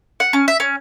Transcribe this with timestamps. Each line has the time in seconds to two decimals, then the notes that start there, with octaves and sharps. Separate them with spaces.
0.20 F#5
0.33 C#4
0.48 E5
0.60 C#4